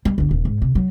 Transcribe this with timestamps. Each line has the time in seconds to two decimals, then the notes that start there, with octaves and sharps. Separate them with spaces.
0.05 G3
0.18 G1 D2
0.31 D#1
0.45 G#2
0.62 C3
0.75 F#3